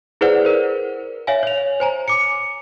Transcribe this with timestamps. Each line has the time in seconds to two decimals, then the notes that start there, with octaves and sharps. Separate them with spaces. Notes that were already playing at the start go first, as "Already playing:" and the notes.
0.21 E4 G#4 B4 C5 D5 F#5
0.45 A#4 C5
1.27 C#5 E5 F5 G#5
1.43 C#5 F7
1.80 C5 G#5 A#5
2.08 D6 C#7